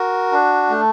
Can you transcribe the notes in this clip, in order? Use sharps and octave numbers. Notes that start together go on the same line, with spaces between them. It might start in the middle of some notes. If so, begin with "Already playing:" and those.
Already playing: F#4 A#4
D4
A3